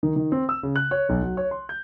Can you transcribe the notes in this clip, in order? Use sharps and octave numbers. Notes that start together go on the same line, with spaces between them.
D#3
D#3
C4
E6
C#3
F#6
C#5
B1
F#3
C#5
C6
G6